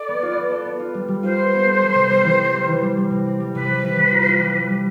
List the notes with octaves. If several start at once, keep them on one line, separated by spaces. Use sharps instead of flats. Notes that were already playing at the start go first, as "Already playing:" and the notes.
Already playing: A4 D5
B3
F4
B3
A4
B3
F4
G3
G3
F4 C5
B3
B3
A4
G3
C3
G3
E3
C4
G3
E3
G3
G3
C3
C4
G3
C3 B4
G3
E3
E3
F4
F4
G3
G3
G3